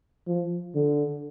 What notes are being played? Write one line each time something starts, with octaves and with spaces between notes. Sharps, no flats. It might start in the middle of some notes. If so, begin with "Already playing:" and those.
F3
D3